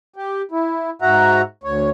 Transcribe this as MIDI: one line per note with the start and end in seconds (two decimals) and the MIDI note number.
0.16 0.42 67
0.51 0.90 64
1.02 1.41 44
1.02 1.41 66
1.02 1.41 76
1.02 1.41 78
1.02 1.41 82
1.64 1.90 38
1.64 1.90 73